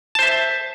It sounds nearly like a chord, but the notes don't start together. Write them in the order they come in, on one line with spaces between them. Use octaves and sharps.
A5 C5 E5